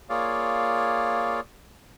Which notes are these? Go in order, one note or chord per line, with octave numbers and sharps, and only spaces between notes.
A#3 F4 G#4 C#5 D5 F5